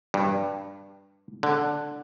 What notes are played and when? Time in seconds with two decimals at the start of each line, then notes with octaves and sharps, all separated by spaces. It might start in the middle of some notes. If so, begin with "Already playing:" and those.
0.14 G2
1.43 D3